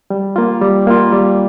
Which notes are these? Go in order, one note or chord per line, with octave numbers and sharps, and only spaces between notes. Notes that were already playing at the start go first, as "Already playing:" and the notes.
G3
A#3 F4
G3
A#3 F4
G3